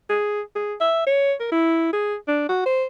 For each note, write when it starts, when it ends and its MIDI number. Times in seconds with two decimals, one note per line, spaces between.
0.09 0.41 68
0.56 0.74 68
0.81 1.06 76
1.06 1.33 73
1.40 1.50 70
1.52 1.91 64
1.92 2.15 68
2.27 2.47 62
2.49 2.63 66
2.66 2.85 72